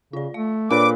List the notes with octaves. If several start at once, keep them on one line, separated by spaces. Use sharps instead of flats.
C#3 F4 D5
A3 F5
A#2 D4 A4 B4 C#5 D6